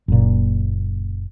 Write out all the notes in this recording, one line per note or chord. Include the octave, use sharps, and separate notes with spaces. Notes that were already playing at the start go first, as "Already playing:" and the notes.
F#1 A#2